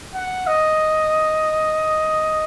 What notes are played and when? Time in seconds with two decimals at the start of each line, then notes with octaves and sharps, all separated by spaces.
0.14 F#5
0.47 D#5